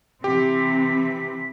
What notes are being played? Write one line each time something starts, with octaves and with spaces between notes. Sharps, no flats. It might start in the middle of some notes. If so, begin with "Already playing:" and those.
C3 E3 C4 G4 B6